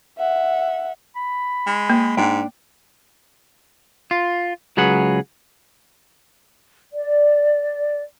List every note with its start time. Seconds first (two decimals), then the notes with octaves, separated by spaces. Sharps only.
0.18 E5 F#5
1.16 B5
1.67 G#3
1.90 A#3
2.17 G#2 D4 G5
4.11 F4
4.77 C#2 F#3 G#4 B4 F#5
6.92 D5